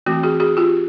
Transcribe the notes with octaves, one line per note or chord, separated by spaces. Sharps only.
E3 A3 C4 F#4
F#4 G#4
F#4 G#4
F4 G4